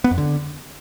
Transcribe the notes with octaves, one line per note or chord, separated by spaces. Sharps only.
B3
F2
D3